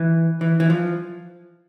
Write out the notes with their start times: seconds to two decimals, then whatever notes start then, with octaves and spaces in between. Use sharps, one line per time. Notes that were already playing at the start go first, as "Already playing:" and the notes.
Already playing: E3
0.41 E3
0.60 E3
0.70 F3